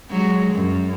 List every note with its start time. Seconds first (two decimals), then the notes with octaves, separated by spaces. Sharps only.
0.11 F#3 G#3
0.54 F#2